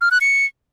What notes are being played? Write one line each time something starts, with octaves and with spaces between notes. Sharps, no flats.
F6
F#6
C#7